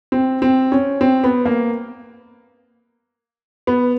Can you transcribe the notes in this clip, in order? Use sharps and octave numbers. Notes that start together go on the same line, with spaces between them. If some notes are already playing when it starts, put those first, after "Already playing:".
C4
C4
C#4
C4
B3
A#3
B3